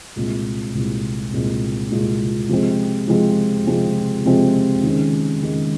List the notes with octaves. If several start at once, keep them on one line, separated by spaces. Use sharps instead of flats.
C2 A#2 G#3 C4 F4
C2 A#2 G#3 C4 F4
C2 A#2 G#3 C4 F4
C2 A#2 G#3 C4 F4
C3 F3 G#3 C4
C3 F3 G#3 C4
C3 F3 G#3 C4
C3 F3 G#3 C4
D#3 G#3 C#4
D#3 G#3 C#4